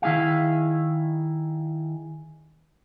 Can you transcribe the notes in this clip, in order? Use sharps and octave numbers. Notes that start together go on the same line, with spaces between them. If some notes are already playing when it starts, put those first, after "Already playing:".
D#3 E4 G#4 F5